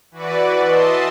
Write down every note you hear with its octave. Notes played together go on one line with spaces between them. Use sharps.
E3 F#4 B4 D5
D#5 E5 A5 C6